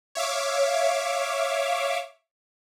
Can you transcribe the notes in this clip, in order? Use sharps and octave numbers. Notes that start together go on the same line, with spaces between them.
C#5 E5 F5 D6